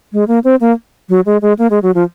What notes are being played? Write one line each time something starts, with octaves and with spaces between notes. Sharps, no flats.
G#3
A#3
C4
A#3
F#3
G#3
G#3
A#3
G#3
F#3
F3